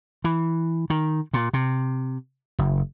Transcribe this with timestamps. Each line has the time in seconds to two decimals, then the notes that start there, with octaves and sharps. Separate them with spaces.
0.24 E3
0.90 D#3
1.34 A#2
1.53 C3
2.59 F#1